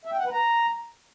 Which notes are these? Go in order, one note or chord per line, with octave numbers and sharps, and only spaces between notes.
E5
G5
F#5
B4
A#5